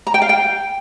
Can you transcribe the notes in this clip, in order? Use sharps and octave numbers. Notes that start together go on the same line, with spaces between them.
A#5
G5
F5
G5